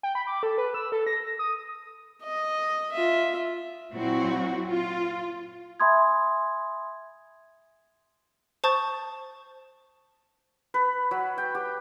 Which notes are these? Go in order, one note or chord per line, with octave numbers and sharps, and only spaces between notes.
G5
B5
D6
A4
B4
E6
A4
A#6
D#6
D#5
F4 E5
A#2 F#3 C4 E4 F#4
F4
E5 G#5 B5 C6 D#6 G#6
C5 A5 C#6 D#6 G6 A6
B4
F#3
G5
G4